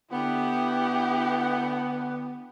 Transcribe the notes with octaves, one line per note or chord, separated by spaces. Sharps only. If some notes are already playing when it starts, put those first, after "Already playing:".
D3 B3 E4 G4